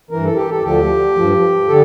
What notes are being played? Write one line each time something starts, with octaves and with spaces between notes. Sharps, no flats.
G2 E3 A#4
A4
G4
A4
D2 D3 F3 G4
G2 F3
D3 A4